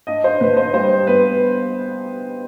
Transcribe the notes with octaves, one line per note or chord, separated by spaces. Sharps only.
D4 D#5
C5
D3 B4
C5
G3 C5
B3 B4